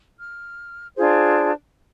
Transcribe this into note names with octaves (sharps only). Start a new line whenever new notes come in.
F6
D4 F4 G#4 C5